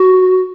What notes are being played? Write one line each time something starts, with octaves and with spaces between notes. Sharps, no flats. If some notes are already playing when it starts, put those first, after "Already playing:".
Already playing: F#4